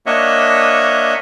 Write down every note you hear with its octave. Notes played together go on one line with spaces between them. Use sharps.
A#3 D4 C#5 D#5 E5 F#5